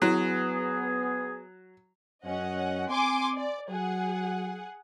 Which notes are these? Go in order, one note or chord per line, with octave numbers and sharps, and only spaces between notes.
F#3 B3 E4 G#4
F#2 C#4 D#5 F#5
C4 G#5 C6 D6
D5
F#3 G#4 F#5